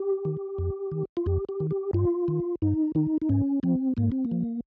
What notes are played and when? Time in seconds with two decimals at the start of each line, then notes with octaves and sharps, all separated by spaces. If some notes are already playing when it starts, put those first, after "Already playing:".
Already playing: G4
0.25 D#3
0.58 F2
0.92 D#3
1.17 F4
1.26 F2 G4
1.49 G4
1.60 D#3
1.71 G4
1.93 G2 F4
2.28 D#3
2.62 G2 D#4
2.95 D#3 D#4
3.22 D#4
3.29 G#2 C#4
3.63 F3 C4
3.97 G#2 A#3
4.12 C4
4.25 A#3
4.31 F3